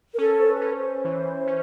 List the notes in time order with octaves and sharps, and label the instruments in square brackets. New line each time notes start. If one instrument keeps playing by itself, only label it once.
[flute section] A#4
[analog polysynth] C#4 [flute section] A4
[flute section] C5
B4
[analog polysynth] C#4
[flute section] C5
[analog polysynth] E3
C#4